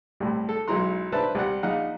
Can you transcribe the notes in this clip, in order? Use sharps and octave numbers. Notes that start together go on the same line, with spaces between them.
C2 A2
A4
B1 G#3 E4 A#5 C6
D4 B4 C5 E5 A5
C2 G3 F#5
A#1 D#4 F5 F#5